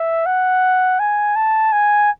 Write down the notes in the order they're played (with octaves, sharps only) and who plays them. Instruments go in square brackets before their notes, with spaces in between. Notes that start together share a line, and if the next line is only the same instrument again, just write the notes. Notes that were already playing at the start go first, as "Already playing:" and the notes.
Already playing: [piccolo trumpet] E5
F#5
G#5
A5
G#5